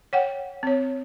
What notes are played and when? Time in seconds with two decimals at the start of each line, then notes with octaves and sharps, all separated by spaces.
0.13 C#5 F#5 G5
0.63 C4 C#5